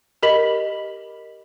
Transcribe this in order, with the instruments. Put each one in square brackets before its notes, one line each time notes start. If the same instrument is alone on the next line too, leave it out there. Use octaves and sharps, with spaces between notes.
[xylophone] G4 A#4 D#5 B5 B6 F#7